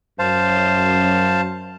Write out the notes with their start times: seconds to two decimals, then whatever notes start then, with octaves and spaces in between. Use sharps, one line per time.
0.19 F#2 C5 F5 A5